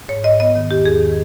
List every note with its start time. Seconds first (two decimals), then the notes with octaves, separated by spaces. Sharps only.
0.08 G#2 C#5
0.24 G#2 D#5
0.40 B3 D#5
0.55 D#3
0.71 E2 G4
0.86 E2 G#4
1.01 D#3